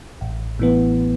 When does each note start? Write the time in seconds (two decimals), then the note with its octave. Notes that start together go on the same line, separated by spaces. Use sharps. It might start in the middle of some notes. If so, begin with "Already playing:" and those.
0.21 A1
0.59 A2 E3 B3